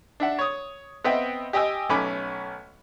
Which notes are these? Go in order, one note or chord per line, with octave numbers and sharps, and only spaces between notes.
D4 E5 F#5
C#5 D#6
B3 C4 D#5 E5 F#5 G5
G4 D#5 G5 G#5 E6
B1 A3 C#4 B5 D6